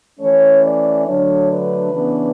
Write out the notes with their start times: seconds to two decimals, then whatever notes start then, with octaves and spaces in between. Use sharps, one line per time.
0.19 E3 A3 C#4 C#5
0.63 D5
1.06 D3 F#3 A3 D4 C#5
1.49 B4
1.92 C#3 E3 B3 D4